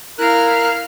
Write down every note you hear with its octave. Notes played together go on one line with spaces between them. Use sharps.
E4 A#4 F5 F#6